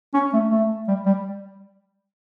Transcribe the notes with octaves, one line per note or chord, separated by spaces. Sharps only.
C#4
A3
A3
G3
G3